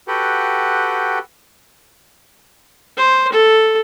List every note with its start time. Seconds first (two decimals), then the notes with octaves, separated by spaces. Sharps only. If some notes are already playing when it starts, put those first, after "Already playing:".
0.08 F#4 G4 A4 B4 F#5 G5
2.97 C5
3.32 A4